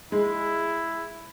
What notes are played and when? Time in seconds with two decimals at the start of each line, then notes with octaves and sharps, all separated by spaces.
0.12 G#3 E4